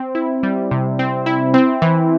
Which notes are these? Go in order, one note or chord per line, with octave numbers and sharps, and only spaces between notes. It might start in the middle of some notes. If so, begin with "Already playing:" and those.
Already playing: C4
E4
G3
C3
C4
E4
C4
E3